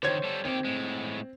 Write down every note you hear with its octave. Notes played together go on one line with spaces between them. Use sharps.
D3 D#3 C5 C#5 G#6
G3 A4
D#3 C4 G4
A2 G#3